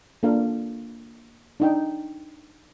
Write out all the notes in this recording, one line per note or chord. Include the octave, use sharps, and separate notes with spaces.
A#3 D4 F4 A4 A#4 F5
D4 D#4 G5